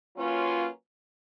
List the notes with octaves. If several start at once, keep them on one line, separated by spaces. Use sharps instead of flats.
F#3 A#3 C#4 F4 B4